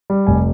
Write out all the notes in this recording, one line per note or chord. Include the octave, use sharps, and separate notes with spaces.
G3
F1 G#5